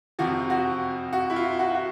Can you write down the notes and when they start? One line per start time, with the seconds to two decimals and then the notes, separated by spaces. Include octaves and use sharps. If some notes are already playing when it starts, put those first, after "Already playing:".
0.19 F2 C3 F3 F#4
0.50 F#4
1.13 F#4
1.30 E4
1.36 F4
1.59 F#4
1.75 F#4